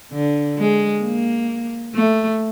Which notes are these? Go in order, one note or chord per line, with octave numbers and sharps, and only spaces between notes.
D3
G#3
A#3
A3